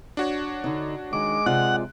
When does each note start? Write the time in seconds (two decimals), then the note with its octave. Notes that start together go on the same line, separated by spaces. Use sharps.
0.17 D4 F#4 C#5
0.64 D3 D#4
1.13 D#3 G#3 D6
1.46 C3 F4 D5 F#5 F#6